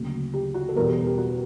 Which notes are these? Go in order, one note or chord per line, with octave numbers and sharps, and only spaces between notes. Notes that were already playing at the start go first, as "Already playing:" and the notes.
Already playing: D2 C#3 F#3 A#3
G4
F#4
A4
E2 B2 G3 B3 A#4
G4
G4
F#4